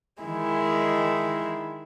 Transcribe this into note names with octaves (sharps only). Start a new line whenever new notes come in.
D#3 G#3 E4